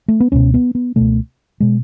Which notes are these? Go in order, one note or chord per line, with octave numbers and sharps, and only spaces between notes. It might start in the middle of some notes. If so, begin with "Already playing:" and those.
A3
B3
C#2 B2 C#4
B3
B3
C#2 B2 A3
B2 G#3